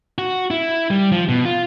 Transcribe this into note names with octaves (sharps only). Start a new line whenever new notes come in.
F#4
E4
G3
F3
B2
F4